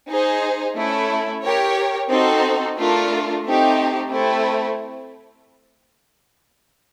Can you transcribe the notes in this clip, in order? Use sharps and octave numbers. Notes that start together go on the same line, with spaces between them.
D#4 G#4 C5
A3 C#4 E4
G4 A#4 C#5
C4 D#4 F#4 A4 C5
A3 D4 F4 A#4
A3 C4 D#4 G4
A3 C4 E4